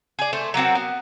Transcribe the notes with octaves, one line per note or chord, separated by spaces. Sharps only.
G#4 D5
A3 C5
F#3 A#3 C4 F#4
B3